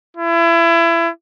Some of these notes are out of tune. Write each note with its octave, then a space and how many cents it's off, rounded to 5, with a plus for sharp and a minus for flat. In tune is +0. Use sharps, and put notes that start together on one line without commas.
E4 +30